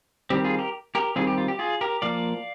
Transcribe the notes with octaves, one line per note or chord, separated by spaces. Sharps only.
D#3 G3 C4 G4
F4 G#4
G4 A#4
G4 A#4
D#3 G3 C4 F4 G#4
G4
F4
G4
F4 G#4
G4 A#4
F3 A#3 D5 F5